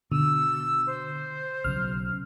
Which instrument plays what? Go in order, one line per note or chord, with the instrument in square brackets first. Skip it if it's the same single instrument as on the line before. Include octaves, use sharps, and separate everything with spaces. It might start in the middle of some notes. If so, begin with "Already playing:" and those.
[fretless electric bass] B2 [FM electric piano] D3 [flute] E6
[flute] C5
[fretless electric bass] B1 C#3 F#3 [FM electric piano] F6